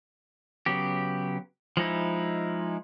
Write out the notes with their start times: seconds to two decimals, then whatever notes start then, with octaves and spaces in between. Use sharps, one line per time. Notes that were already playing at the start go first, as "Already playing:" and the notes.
0.66 C#3 F#3 B3 G4
1.77 F3 G#3 D#4 E4